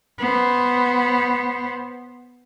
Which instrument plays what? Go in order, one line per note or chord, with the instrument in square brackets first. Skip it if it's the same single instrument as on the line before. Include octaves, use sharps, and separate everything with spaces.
[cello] B3 C5